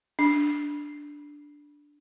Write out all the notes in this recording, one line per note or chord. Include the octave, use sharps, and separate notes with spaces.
D4